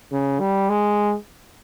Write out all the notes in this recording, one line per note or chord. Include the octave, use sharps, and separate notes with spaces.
C#3
G3
G#3